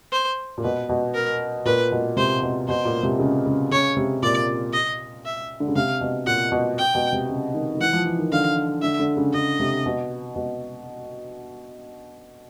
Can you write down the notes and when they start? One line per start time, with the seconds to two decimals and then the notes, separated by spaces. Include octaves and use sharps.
0.12 C5
0.58 A#2
0.63 B2 B4
0.89 B2
1.14 A#4
1.65 A#2 B4
1.92 B2
2.17 C3 C5
2.42 B2
2.68 B2 C5
2.85 A#2
3.03 C3
3.20 C#3
3.46 C#3
3.71 C#3 C#5
3.97 C3
4.23 A#2 D5
4.73 D#5
5.25 E5
5.60 D3
5.68 C#3
5.76 C3 F5
6.01 B2
6.26 A#2 F#5
6.52 B2
6.78 G5
6.95 B2
7.13 C3
7.29 C#3
7.54 D#3
7.74 D#3
7.80 E3 F#5
7.93 F3
8.06 E3
8.19 D#3
8.32 D3 F5
8.82 D3 E5
9.00 D3
9.17 C#3
9.33 C#3 D#5
9.60 C3
9.86 B2
10.36 B2